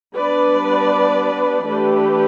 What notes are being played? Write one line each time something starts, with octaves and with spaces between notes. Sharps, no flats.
G3 B3 D4 B4 D5
E3 A3 D4 G4 B4